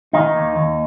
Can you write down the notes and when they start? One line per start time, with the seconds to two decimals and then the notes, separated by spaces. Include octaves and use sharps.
0.13 D#3 D#4
0.35 D#2
0.56 D#2